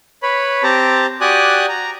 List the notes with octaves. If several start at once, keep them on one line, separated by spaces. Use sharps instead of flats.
B4 C#5 B5
C4 G4 A5 A#5
F#4 G4 D5 G#5 D#6 F#6
A#5